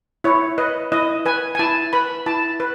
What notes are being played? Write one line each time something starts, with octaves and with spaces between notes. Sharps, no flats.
E4 C#5
B4 D#5
E4 D#5
B4 G#5
G#5
E4 A5
B4 B5
E4 A5
B4